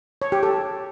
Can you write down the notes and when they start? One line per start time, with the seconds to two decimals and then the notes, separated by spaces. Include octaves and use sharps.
0.22 C#5
0.32 G4
0.43 A4